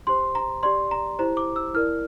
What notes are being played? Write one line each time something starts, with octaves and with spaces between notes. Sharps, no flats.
G4 C5 C6
A#5
G4 D5 C6
A#5
E4 G4 C5 A#5
D6
E6
E4 A#4 D5 F6